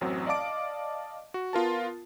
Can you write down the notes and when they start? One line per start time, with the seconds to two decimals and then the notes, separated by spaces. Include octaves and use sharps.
0.01 A1 F#2 F#3 C4
0.27 D5 D#5 F5 A5 D6 D7
1.34 F#4
1.53 B3 F4 A#4 A5